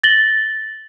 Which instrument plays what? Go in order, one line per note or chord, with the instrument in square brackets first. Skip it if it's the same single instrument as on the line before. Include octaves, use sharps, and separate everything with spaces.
[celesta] A6 A#6 F#7 G7